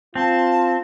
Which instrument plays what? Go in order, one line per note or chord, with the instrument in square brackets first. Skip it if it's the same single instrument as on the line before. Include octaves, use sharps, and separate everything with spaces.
[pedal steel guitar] C4 [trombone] F4 [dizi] A5